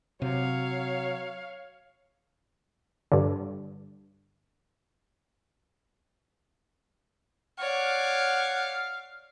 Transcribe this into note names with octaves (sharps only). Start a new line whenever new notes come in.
C3 F#3 C#5 F5
G2 D3
C#5 D5 F5 F#5